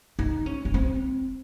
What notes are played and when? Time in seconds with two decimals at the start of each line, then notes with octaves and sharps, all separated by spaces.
0.19 D#4
0.46 C#4
0.65 C#4
0.74 C4